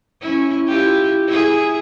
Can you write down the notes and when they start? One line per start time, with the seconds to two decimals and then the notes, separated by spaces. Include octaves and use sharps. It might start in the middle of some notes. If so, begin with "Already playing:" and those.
0.21 C#4 E4
0.67 E4 F4 G4
1.28 E4 G#4